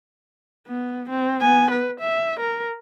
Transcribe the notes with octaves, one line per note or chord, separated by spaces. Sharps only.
B3
C4
B3 G#5
B4
E5
A#4